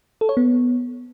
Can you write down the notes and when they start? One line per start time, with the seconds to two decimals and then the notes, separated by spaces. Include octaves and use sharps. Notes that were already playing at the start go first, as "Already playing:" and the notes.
0.21 A4
0.29 C#5
0.37 B3